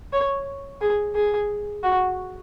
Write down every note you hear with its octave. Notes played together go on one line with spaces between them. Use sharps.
C#5
G#4
G#4
F#4